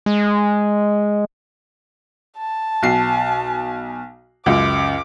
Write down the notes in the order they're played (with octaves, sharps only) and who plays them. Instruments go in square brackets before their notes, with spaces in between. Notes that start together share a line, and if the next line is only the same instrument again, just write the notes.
[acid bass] G#3
[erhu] A5
[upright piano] B1 C7
[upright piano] C#2 F#2 [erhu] D6